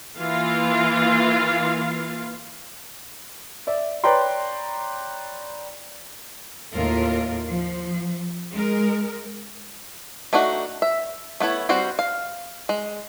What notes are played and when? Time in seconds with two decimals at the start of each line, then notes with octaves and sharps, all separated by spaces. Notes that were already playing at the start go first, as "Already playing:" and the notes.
0.17 E3 A#3 F4 F5
3.67 D5 E5
4.04 B4 C#5 D5 G5 A#5 C6
6.73 D#2 A2 F4 A#4
7.49 F3
8.54 G#3 A#4
10.33 A3 D4 D#4 F#4
10.82 E5
11.40 A3 B3 E4 C#5
11.69 G3 C4 F#4 C5
11.99 F5
12.69 G#3